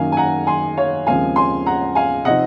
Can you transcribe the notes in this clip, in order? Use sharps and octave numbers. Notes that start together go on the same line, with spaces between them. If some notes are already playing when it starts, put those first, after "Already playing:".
Already playing: F#2 D#3 F#3 A#3 F5 G#5
G#5
F#5 A#5
G#5 C6
C#5 F5
D#2 C#3 F3 G#3 C4 F5 G#5
G#5 C6
F#5 A#5
F5 G#5
C3 F3 C4 D#4 D#5 F#5